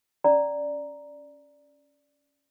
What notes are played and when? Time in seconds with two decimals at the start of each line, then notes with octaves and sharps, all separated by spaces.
0.24 C#4 D5 A#5